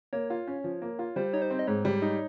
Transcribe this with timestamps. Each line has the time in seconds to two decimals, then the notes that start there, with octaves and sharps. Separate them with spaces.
0.13 A#3 C#5
0.30 F4
0.47 C#4
0.64 F3
0.82 A#3
0.99 F4
1.16 G3 C5
1.33 D#4 C#5
1.42 C5
1.50 C4
1.59 D#5
1.67 G#2 C#5
1.85 G3
2.02 D#4